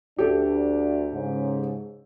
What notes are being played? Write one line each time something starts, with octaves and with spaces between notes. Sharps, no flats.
D2 D4 G4 A4
G#2 C#3